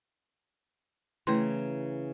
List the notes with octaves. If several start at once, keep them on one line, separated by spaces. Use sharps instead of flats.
C#3 E3 A3 A#5 C6